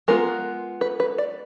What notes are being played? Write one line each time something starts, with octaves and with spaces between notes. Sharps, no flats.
G#3 B3 F4 A#4
B4
B4
D5